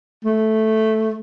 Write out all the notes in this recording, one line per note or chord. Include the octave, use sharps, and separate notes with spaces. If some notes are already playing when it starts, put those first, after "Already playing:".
A3